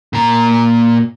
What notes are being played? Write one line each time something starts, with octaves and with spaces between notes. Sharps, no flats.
A#2 A#5